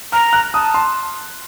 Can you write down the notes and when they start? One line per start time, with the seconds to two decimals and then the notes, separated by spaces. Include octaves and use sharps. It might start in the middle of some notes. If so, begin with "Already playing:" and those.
0.12 A#5 F6
0.33 F#6
0.53 A5 D#6
0.74 C6